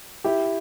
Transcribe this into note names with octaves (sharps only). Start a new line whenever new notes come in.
E4 G4